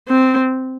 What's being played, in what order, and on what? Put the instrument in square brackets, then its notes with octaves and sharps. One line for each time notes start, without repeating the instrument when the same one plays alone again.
[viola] C4